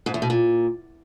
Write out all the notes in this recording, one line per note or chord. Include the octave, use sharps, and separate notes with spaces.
G#2
E2
B2
A#2